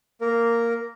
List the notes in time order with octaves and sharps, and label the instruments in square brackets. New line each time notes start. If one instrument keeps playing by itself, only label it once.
[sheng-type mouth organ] A#3 A#4